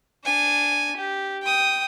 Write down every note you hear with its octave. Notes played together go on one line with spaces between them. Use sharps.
D4 G#5
G4
G5 D#6